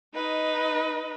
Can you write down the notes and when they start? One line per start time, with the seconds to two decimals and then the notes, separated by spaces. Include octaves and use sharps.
0.13 D#4 B4 D#5